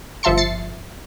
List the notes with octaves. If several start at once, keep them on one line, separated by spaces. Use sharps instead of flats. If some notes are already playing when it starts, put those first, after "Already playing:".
G1 F3 E5 A5 C6 C#7
A6 C7 C#7